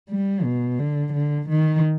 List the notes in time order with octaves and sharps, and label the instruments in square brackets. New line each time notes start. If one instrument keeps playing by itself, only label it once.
[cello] G3
B2
D3
D3
D#3